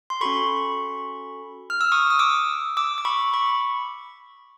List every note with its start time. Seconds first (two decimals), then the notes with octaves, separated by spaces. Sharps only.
0.10 C6
0.21 C#4 F#4 A4 B5 C#6
1.70 F6
1.81 E6
1.92 C#6 D#6
2.10 D#6
2.19 D6 E6
2.77 D6 E6
2.98 D6
3.05 B5 C#6
3.34 B5 C#6